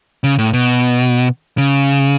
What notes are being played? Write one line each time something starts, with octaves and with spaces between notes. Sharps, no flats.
C#3
A2
B2
C#3